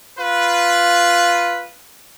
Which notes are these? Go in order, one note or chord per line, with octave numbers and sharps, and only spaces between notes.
F4 B4